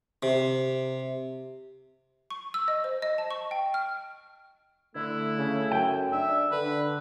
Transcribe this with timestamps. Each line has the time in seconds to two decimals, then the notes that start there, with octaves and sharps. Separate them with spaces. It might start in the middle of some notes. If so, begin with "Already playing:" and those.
0.23 C3
2.31 C#6
2.54 E6
2.68 D#5
2.84 C5
3.02 D#5
3.18 A5
3.31 C#6
3.51 G5
3.74 F6
4.95 D3 A3 E4
5.38 C#3
5.71 F#2 G5
6.13 D4 E5
6.52 D3 B4